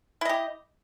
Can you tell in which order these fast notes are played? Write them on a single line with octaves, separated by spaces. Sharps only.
E4 D#5 G4